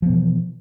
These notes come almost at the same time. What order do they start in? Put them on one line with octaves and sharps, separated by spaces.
F3 B3 B2 E3